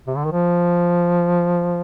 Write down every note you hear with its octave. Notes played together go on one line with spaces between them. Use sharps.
C3
D3
D#3
F3